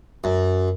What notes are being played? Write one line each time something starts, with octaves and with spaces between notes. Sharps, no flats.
F#2